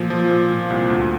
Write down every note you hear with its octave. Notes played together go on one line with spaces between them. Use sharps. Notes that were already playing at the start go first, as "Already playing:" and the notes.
Already playing: A#2 F3
F3
A#2
A#2
C2
D2